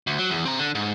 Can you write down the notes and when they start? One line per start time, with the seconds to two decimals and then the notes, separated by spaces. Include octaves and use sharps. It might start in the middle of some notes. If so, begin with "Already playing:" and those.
0.07 D2
0.19 F#3
0.30 E2
0.45 C4 A#5
0.59 D3
0.75 G#2